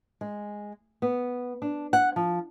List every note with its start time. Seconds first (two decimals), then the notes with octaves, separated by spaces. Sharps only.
0.21 G#3
1.02 B3
1.62 D4
1.93 F#5
2.16 F3